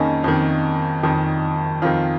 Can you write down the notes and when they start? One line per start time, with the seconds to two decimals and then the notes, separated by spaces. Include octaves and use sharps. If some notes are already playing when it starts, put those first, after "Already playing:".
Already playing: F2 D#3 A#3 C#4 D#4 G#4
0.24 F2 D#3
1.03 F2 D#3
1.82 F2 D#3 F4